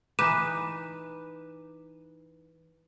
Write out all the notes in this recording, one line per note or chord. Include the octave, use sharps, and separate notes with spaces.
E3 D#4 B4 D6 D#7 E7